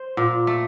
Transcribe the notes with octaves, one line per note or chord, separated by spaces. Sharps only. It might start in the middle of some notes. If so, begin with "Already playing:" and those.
Already playing: C5
A#2
A3